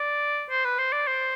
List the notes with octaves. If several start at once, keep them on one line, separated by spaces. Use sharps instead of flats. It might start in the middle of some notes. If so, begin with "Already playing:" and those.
Already playing: D5
C5
B4
C5
D5
C5